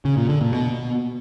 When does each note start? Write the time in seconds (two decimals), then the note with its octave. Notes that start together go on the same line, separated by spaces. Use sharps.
0.05 C#3
0.17 A#2
0.29 D3
0.41 A#2
0.53 B2